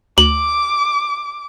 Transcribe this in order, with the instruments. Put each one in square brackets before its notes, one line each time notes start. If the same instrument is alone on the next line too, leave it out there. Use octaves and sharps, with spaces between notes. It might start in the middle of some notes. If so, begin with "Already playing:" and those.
[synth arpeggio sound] D2 [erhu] D6 [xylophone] F#7